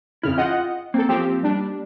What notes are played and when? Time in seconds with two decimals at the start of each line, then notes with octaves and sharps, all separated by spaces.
0.23 F2 C#3 E4 F6
0.38 F4 D#5 F#5 G5
0.94 A#3 C4 A4
1.09 F3 C4 G4
1.43 G3 D4